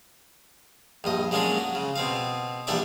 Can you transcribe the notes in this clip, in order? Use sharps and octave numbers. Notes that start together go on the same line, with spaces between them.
A#1 G2 D#5
F#3 G#3 A#3 C#4 D4 G#4
F#3
C#3
B2 C4 F5
A#1 E3 G3 D4 E5 D6